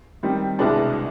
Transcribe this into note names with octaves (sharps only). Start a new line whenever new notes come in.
D#3 G3 C4
C2 B2 G#3 B3 D4